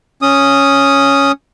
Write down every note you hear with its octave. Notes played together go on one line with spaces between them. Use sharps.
C#4 D#6